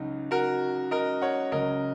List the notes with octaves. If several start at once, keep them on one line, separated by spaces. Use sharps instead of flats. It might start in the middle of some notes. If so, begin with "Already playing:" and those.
Already playing: C#2 C#3 F#3 D#4
F#4 A#4
A#4 D#5
C#5 F#5
C#2 C#3 F#3 A#4 D#5